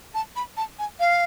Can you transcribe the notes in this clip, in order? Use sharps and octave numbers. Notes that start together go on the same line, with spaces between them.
A5
B5
A5
G#5
F5